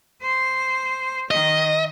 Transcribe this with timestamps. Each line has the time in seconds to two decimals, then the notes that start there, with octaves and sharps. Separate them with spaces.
0.22 C5
1.31 D#3 D#5